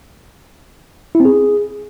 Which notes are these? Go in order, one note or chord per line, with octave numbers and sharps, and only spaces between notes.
E4
C4
G#4